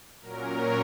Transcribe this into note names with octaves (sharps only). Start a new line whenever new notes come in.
A#2 F#3 C#4 A#4
C#5